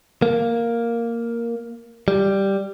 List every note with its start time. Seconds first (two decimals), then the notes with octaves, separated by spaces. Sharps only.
0.22 A#3
2.08 G3